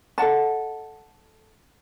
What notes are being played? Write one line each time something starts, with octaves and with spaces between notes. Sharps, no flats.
A4 D#5 F#5 A5